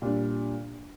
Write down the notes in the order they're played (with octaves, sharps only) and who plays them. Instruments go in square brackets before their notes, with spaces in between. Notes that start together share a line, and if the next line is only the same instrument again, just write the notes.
[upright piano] A#2 G3 D4